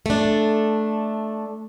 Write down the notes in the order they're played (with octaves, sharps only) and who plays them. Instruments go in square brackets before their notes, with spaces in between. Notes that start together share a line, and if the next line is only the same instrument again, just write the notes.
[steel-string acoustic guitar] A3 D4